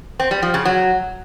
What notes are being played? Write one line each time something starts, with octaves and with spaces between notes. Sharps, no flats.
C4
G3
F3
C#3
F#3